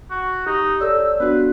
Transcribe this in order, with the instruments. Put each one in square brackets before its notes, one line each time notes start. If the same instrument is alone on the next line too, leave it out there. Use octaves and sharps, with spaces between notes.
[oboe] F#4
[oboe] D#4 [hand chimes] G4
[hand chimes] A4 C#5 D5 [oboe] E6
[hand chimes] B3 D4 F#4 [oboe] B4